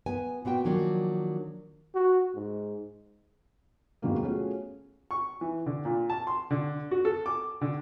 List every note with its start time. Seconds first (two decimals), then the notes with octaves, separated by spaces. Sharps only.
0.06 B3 G#5
0.45 A#2 B3 F#4 G5
0.64 D#3 F3 F#3 A#3 D4 G#5
1.95 F#4
2.35 G#2
4.02 E2 G#2 C3 D#3 F#3 A#3
4.23 A3 B3 C#4 F4 F#4 G#4
5.11 C#6
5.41 E3
5.66 D3
5.85 A#2
6.10 A5
6.27 C6
6.51 D3
6.91 F#4
7.05 A4
7.26 D6
7.61 D3